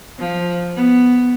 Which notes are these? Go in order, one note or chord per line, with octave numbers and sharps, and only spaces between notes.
F3
B3